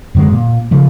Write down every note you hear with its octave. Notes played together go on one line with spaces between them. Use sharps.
F#2 D3 F#3 G#3
A#2
C#3 F3